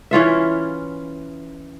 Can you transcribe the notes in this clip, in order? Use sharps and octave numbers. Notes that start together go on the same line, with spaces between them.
E3 C#4 F4 E5